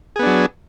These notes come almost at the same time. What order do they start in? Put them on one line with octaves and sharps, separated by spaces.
G#4 B3 D4 F#3